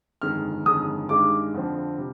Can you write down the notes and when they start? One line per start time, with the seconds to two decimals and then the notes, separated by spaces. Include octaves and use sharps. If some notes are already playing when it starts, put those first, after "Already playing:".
0.22 G1 F2 D#3 G#3 F6
0.65 G1 F2 D#3 G#3 D#6
1.09 G2 D#3 G#3 D#4 D6
1.54 F2 D3 F3 C4
1.97 C3 G3